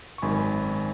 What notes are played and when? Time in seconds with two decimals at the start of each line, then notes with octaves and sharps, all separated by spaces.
0.18 C#6
0.22 G#1 F#2 D#3 G#3 G#5 B5